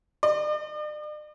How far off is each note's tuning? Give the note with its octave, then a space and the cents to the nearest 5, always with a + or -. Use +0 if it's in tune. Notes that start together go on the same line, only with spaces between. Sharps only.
D5 +45